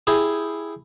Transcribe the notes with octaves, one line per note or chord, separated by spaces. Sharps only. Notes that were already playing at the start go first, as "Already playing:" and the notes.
E4 G4 G#4